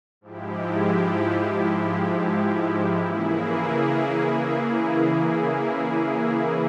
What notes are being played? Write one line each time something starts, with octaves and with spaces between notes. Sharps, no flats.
G#2 F3 G#3 E4 G4
C#3 E3 A#3 E4 G#4